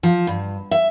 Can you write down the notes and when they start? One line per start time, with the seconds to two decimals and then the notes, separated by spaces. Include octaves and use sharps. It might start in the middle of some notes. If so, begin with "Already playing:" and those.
0.03 F3
0.27 G2
0.71 E5